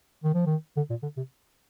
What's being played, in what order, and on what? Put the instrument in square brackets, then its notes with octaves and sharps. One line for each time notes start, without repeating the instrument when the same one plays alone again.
[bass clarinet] D#3
F3
D#3
D3
A#2
D3
C3